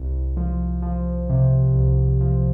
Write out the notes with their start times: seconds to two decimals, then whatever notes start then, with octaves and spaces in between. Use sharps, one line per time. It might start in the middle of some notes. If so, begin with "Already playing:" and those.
Already playing: C2
0.37 F3
0.82 F3
1.29 C3
1.74 C2
2.21 F3